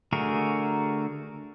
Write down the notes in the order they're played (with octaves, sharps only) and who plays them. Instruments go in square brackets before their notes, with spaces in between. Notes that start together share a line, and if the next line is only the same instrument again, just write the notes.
[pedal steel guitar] D3 A3 F#4 G#4 A#4